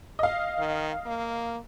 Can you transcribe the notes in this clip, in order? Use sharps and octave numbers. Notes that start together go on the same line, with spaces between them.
D#5 F5
D#3
A#3